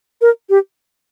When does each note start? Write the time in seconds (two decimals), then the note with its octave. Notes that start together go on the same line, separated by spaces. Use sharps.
0.21 A#4
0.50 G4